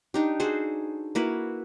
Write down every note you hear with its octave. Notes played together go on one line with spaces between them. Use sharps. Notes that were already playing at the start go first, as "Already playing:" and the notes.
D4 D#4 G4
F#4 G#4 A4 C5
A#3 E4 F#4 B4